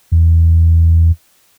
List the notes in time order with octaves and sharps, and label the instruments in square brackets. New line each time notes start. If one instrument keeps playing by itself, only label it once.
[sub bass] E2